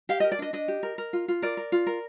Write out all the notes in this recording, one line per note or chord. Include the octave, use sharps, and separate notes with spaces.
G4 F5
A#4 D#5
D5
D4 D#5
D4 D#5
G4
A#4
A#4
F4
F4
A#4 D5
A#4
F4
A#4